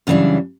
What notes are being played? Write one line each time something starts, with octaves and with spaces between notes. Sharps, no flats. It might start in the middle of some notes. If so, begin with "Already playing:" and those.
F#2 C#3 E3 G3 D4